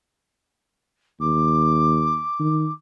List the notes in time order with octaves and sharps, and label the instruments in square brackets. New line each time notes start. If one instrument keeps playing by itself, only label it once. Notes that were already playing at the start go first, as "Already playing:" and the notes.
[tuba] D#2 [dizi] D6
[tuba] D#3